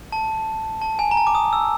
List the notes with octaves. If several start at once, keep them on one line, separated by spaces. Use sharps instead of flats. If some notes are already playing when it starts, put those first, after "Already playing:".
A5
A5
G#5
A#5
A5
D6
D#6
E6